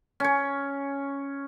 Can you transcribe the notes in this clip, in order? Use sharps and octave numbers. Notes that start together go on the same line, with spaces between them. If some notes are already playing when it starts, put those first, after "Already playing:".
C#4 C#5